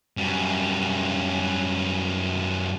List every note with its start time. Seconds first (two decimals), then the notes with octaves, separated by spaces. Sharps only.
0.17 F#2 G3